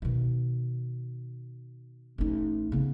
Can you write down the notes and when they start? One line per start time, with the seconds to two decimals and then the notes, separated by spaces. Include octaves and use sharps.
0.02 B2 D#3
2.18 A1 D#4
2.72 C#3 B3